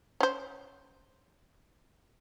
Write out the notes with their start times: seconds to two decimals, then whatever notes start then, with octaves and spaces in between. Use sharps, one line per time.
0.20 C#4 C5